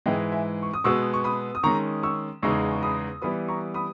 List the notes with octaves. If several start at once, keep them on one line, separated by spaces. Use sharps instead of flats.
G#2 E3 G#3 D#5 G5
E5 G#5
C#6
D#6
B2 G#3 B3 C#6 E6
C#6
B5 D#6
D#6
D#3 G#3 C#4 A#5 C#6
C#6 E6
E2 C#3 G#3 B3 D#4 C#6 E6
C#6
B5 D#6
E3 G3 B3 B5 D#6
A#5 C#6
B5 D#6